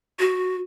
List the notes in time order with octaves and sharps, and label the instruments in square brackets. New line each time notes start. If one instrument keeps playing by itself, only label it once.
[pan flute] F#4